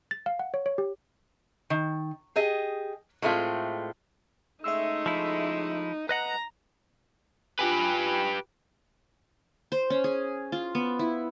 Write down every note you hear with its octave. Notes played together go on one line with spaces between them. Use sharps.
A6
F5
F#5
C#5
C#5
G4
D#3
G4 G#4 D#5
A2 G#3 A3 C4 F4
C#3 G#3 A3 D#4 E5 E6
F3 E4
B4 D#5 F#5 A#5
F4 G4 B4 G#5
C5
C#4
G#4
F4
B3
E4